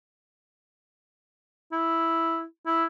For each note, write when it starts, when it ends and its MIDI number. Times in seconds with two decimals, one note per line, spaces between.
1.72 2.44 64
2.66 2.85 64